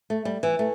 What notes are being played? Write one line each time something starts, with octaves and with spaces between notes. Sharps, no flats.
A3
G3
E3
A3